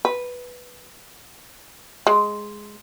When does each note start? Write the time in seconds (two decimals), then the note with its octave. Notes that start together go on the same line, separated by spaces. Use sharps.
0.05 B4
2.07 G#3